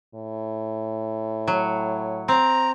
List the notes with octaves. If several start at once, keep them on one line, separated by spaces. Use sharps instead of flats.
A2
F#3
C4 A#5